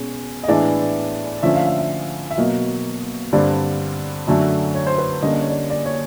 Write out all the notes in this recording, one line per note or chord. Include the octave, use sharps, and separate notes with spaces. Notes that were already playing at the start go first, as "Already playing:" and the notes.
Already playing: B2 G#3 C#4
D#5
A2 E3 G#3 B3 D4 D5
D3 F3 A3 C#4 E5
F5
E5
E5
E5
B2 F#3 A#3 D#5
G2 D3 G3 C4 D5
F#2 D3 F#3 A3
C#5
C5
B4
D3 G3 A#3 C#4 D#5
D5
C#5
D5
D5
C#5